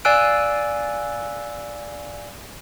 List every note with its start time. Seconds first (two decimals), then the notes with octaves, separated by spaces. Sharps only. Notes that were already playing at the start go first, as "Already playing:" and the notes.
0.05 D5 F5 G#5 E6 F#6 D7